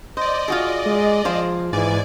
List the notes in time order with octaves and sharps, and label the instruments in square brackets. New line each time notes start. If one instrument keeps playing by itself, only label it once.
[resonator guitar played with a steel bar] C5 [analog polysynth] D5 D#5
[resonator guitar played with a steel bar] F4 F#4 G#4
[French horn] G#3
[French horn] F3 [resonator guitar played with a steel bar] G#4 C5 F5
[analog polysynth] G#2 D5 G#5 [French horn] E3